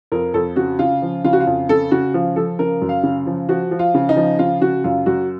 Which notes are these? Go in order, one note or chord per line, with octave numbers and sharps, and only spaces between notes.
F2 A#4
F2 A4
C#3 F#4
C#3 F4
F3
C#3 F4
F#4
F4
F2
C#3 A4
C#3 F#4
F3 F4
F3 A4
C#3 A#4
F#2
F5
C#3
F3
F3 F#4
F3
F4
C#3
D#4
F3
C#3 F4
C#3 F#4
F#2 F4
F#2 F#4